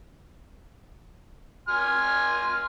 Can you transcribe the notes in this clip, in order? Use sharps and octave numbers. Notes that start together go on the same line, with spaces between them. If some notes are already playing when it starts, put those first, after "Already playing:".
G#5 C6 F6